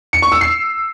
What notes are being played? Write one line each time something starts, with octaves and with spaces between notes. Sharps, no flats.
C#7
C#6
E6
C7